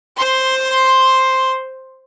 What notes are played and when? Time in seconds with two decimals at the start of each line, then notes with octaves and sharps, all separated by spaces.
0.17 C5 C6